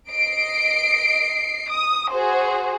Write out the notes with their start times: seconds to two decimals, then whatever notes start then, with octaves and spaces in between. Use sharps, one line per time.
0.10 D#5 C7 D7
1.69 D#6
2.11 F#4 G#4 C5